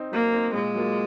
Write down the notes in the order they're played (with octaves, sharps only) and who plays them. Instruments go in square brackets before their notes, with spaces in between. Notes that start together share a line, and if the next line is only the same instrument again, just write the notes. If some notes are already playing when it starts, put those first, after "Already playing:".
Already playing: [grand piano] C4 D#4
[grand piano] F#3 [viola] A#3
[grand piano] C4 D#4
[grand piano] A#2 [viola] G#3
[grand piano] F#3 A#3 F4